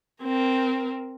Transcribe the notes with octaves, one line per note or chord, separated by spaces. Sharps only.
C4 A#4